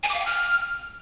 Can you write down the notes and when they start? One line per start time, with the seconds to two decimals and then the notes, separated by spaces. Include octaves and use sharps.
0.03 G#5
0.09 D6
0.14 F5
0.20 G5
0.26 F6